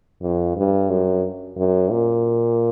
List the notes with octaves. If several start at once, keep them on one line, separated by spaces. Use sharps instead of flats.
F2
G2
F#2
F#2
A#2